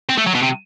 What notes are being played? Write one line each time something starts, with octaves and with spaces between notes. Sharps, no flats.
C4
A3
F#3
B2
C3